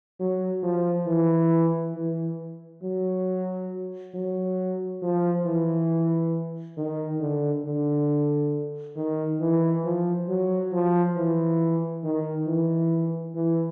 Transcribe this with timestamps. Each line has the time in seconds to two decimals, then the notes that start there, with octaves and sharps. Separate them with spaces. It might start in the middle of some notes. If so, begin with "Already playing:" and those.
0.20 F#3
0.63 F3
1.07 E3
1.95 E3
2.83 F#3
4.14 F#3
5.02 F3
5.46 E3
6.77 D#3
7.21 D3
7.65 D3
8.96 D#3
9.41 E3
9.85 F3
10.28 F#3
10.72 F3
11.16 E3
12.04 D#3
12.47 E3
13.35 E3